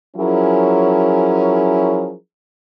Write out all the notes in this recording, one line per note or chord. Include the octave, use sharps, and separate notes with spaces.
F3 F#3 C#4 E4 G#4 A#4